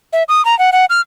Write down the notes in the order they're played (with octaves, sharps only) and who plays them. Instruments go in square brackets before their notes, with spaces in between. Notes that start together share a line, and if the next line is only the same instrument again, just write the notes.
[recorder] E5
D#6
A#5
F#5
F#5
F6